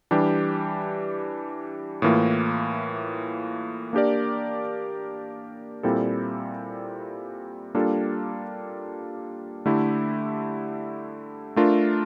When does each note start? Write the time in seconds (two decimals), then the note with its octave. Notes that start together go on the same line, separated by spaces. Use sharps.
0.11 E3 G3 D4 G4
2.02 A2 E3 A#3 F4
3.93 A#3 D4 G4 A#4 D5
5.83 A#2 G3 C4 E4 A4
7.75 G3 A#3 D4 F4 A4
9.65 D3 A3 E4 G4
11.56 A3 D4 F4 A#4